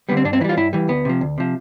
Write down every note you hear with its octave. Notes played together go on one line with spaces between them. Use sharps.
D3 G3 B3
C4
G2 D4
C4
E3 G3 E4 F4
G2 E4
E3 G3
D2 B3
C3 F3
D2
C3 F3